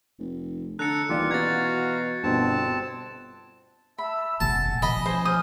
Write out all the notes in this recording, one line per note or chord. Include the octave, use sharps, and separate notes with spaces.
F1
D3 A4 A#5 F#6 C#7
D#1 E3 F4 G4 D5
B2 F#4 F5 A#5 G#6 A6
G1 G2 B2 C4 A5
E5 A5 B5 E6
F1 A#1 F#5 G#5 A5
B2 F3 D#5 B5
C#4 C5 G#5
D#6 F6 G6